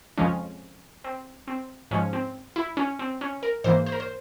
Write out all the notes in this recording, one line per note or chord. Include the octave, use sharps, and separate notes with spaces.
F2 C#3 F3 G#3 C#4
C4
C4
G#2 F3 G#3 C#4
C4
E4
C#4
C4
C#4
A#4
G#2 E3 A#3 C5
C5
A#4
C5